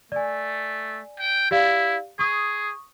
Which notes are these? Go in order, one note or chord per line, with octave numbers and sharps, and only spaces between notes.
A3 D5 G#5
G5
E4 G4 D5 F5
G#4 C#6 D#6